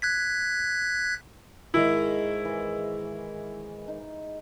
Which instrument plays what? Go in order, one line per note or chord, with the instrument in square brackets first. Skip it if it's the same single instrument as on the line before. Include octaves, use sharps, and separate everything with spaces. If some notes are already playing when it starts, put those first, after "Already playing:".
[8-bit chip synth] F#6 G#6 B6
[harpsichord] G#2 D#3 [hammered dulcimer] G#3 G#4 [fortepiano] E4
[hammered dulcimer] E3
D#4